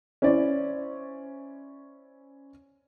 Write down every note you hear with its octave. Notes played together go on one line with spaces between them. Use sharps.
C#4 E4 C5 D5